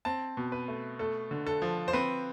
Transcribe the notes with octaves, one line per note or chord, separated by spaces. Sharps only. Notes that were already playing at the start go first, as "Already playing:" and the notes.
C4 A5
B2
B4
A3
A3 A4
D3
A4
F3
C5
C4 B4